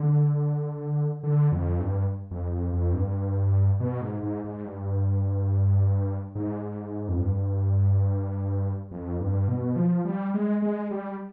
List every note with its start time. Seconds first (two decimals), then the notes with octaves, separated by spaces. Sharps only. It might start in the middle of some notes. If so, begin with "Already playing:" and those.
Already playing: D3
1.23 D3
1.52 F2
1.80 G2
2.31 F2
2.52 F2
2.73 F2
2.94 G2
3.80 B2
4.01 G#2
4.23 G#2
4.44 G#2
4.65 G2
6.35 G#2
7.09 F2
7.21 G2
8.91 F2
9.20 G2
9.48 B2
9.76 F3
10.05 G3
10.34 G#3
10.62 G#3
10.91 G3